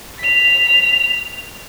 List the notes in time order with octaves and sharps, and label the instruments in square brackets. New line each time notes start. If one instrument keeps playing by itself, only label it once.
[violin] B6 F7